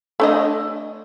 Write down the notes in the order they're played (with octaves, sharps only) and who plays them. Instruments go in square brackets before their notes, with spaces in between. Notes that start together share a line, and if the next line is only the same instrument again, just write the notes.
[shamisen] A3 D4 D#5